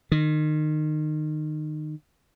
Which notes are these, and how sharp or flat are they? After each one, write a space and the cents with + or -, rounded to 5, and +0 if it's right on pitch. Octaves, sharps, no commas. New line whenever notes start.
D#3 -25